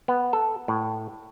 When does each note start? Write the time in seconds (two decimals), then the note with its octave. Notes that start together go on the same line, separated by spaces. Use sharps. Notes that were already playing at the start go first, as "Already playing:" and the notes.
0.08 B3
0.33 A4
0.68 A2